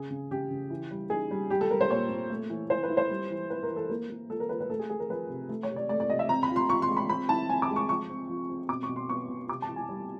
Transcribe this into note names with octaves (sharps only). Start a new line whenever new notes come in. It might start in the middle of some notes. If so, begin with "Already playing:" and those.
Already playing: C#3 G#4
C#3
C#3 G4
C#3
E3
G3
D#4 G#4
G3
G3 G4
A4
G3 A#4
C5
A#2 C#5
A#2
A3
E3
E3 C5
B4
E4
C5
G3
E3
E3 B4
A#4
E3
A4
A#3 A#4
A#3
F4 A4
A#4
F4 B4
B4
A3 A4
G#4
A3 G#4
A#4
F3 B4
C3
A3
C#5
C3
D5
A3 D5
D5
C3 D#5
E5
C4 A#5
B5
F4
C6
F4 C#6
C6
G#3
B5
C4 B5
E4 A5
C4 G#5
D6
G#3
C#6
F3 C#6
C4
F3
C4
B2 D6
C#6
B2
C6
B3 C#6
B2
C3 D6
A5
E3
G#5
G3